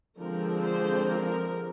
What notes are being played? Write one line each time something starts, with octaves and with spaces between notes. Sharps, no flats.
D3 F3 G#3 C4 A#4
C5
A#4